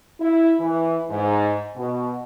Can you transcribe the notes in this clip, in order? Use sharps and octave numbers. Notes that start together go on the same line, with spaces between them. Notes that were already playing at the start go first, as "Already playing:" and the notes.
E4
E3
G#2
B2